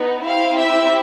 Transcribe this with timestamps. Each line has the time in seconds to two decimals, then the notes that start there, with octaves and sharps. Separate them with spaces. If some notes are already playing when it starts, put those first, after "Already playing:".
Already playing: B3 D#4
0.25 C4 E4 G4 F5
0.58 E5